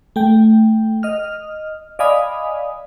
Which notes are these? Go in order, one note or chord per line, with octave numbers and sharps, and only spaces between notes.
A3 G5
D#5 F6
D5 D#5 F5 G#5 B5 D#6